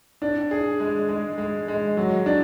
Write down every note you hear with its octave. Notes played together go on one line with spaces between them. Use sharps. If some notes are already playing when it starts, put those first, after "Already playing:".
D4
G#4
G#3
G#3
G#3
G#3
F#3
D4